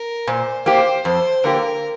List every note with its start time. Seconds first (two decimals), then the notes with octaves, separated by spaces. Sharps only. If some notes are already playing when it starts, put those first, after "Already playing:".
Already playing: A#4
0.27 A#2 C5
0.66 A#3 G4 C5
1.05 F2 C5
1.44 D3 A#3 G4 A#4